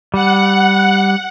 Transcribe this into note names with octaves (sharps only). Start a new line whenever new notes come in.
G3 F#5